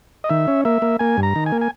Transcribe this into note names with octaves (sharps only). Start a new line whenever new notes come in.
D#5
D#3 E5
C#4
A#3 E5
A#3
A#3 G#5
G2
A#5
D#3
G#5
A#3
G#5